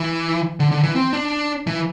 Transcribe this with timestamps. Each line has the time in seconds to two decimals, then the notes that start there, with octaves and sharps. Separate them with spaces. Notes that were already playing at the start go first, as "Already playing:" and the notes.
Already playing: E3
0.60 D3
0.72 D3
0.83 E3
0.96 C4
1.13 D4
1.67 E3